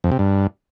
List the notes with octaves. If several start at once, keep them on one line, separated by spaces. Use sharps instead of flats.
F2
C3
G2